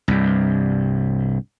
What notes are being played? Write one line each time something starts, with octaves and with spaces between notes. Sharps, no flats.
C2 G2